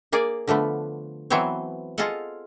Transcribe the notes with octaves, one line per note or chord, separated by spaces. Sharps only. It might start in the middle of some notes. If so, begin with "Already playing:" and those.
A#3 G#4 D5
D3 F3 A3 B3
E3 F#3 B3 C4 C5 C#5
F4 G#4 A4 D#5 F5 F#5